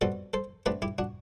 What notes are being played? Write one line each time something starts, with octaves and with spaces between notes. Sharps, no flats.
B2 G3 C4 F#4 A4
A4 C5
D3 A3 C4 G4 B4
E4 G4
D4 F#4